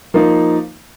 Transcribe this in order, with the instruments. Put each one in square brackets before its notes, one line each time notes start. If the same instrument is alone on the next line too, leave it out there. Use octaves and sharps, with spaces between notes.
[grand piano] F3 A#3 D#4